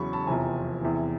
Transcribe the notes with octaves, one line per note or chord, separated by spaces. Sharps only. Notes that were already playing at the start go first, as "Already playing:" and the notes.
Already playing: E2 C#3 F#3 B5 C#6
A5 B5
F1 E2 C3 F3 G#5 A#5
E2 C3 E3